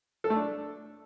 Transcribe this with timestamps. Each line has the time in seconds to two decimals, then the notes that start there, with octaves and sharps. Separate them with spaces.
0.24 A4
0.30 A3
0.36 D4